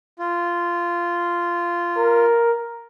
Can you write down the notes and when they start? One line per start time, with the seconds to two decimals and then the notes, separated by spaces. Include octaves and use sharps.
0.19 F4
1.97 A#4